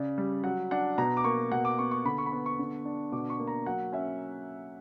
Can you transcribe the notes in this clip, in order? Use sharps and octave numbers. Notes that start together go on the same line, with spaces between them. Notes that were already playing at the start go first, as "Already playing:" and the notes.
Already playing: C#3 D5
G3
F#3 F#5
D4 F#5
B2 A#5
D6
A#3 C#6
B2 F#5
D6
B3 C#6
C#6
D3 B5
C#6
B5
B3 C#6
C#6
D3
D4
B2 D6
C#6
A#3
A#5
F#3 F#5
C#4 E5